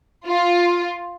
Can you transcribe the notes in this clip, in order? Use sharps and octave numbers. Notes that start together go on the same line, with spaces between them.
F4